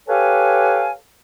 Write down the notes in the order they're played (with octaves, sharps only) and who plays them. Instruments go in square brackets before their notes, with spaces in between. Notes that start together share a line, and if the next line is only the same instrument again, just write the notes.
[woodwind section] G4 A4 B4 C#5 F5 G#5